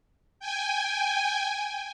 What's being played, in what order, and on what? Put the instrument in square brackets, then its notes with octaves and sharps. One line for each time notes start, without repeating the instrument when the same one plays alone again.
[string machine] G5 G#5